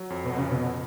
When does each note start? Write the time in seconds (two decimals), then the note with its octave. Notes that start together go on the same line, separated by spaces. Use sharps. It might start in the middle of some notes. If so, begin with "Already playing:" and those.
Already playing: F#3
0.10 F2
0.25 B2
0.38 F2 C#3
0.51 B2